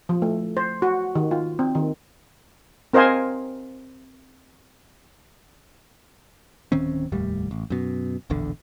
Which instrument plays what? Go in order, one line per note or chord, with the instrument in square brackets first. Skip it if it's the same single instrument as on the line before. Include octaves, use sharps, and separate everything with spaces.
[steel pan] F3
A3
C5
F#4
D#3
F4
C4
D#3
C4 A#4 C5 D#5 F5 G#5
[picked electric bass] D1 D#3 C4 C#4
F1 D#2 A2 G3
A1
F#2 B2
E1 A#1 E2 D3